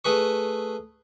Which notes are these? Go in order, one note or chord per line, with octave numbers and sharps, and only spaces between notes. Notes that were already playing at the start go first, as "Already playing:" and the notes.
A3 G#4 B4 C#6